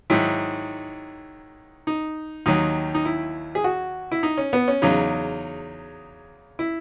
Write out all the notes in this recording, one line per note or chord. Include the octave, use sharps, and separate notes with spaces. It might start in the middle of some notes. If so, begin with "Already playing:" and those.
G#2 D#3 F#3 E4
D#4
D#2 D#3 F#3 D#4
D#4
E4
G#4
F#4
E4
D#4
C#4
B3
C#4
E2 C#3 F#3 D#4
E4